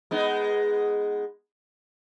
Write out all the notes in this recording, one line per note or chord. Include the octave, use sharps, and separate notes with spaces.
G#3 B3 D#4